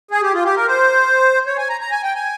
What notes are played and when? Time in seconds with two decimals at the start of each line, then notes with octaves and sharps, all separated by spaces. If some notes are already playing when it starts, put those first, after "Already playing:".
0.11 G#4
0.22 G4
0.34 F4
0.45 G4
0.56 A#4
0.68 C5
1.47 C#5
1.58 G#5
1.69 A#5
1.81 A#5
1.92 G#5
2.03 G5
2.15 G#5